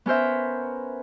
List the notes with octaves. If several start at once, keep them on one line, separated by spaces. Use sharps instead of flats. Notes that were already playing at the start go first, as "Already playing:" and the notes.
B3 C#4 A#4 C5 E5